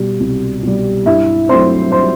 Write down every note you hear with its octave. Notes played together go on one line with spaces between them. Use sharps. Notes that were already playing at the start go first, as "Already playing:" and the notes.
Already playing: B2 G3
C2
B2 G3
G2 E4 E5
F#3 A3 C4 C5 C6
C5 C6